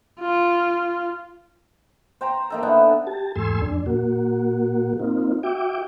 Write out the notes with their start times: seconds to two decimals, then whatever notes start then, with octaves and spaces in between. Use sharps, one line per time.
0.20 F4
2.21 C5 G5 A#5 C6
2.50 A#3 D#4 A4
2.63 D3 B3 D4 E4
3.07 G4 A5
3.35 E2 G#2 A3 G#5 C6 E6
3.62 F2 D4
3.86 A#2 A#3 F#4
4.99 A#3 C4 D#4 F4
5.43 F#4 E5 G5 D6